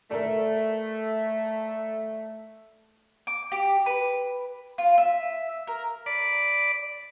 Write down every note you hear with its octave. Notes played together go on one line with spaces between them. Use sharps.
A3 A#4 D5
D6
G4
B4
F4
E5
A#4
D5 B5